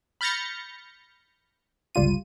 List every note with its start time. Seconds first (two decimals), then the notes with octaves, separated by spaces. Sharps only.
0.21 B5 F6 G6 A6 A#6 C#7
1.95 G1 C#2 G3 F4 D#7